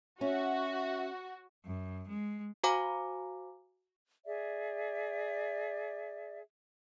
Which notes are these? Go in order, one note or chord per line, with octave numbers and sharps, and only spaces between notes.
C#4 F#4 E5
F#2
G#3
F#4 C5 F5 G#5 A#5 D6
G#4 D5 E5